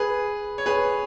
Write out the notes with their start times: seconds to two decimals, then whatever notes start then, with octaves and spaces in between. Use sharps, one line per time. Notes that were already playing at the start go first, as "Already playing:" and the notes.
Already playing: G#4 B4
0.58 C#5
0.66 G#4 B4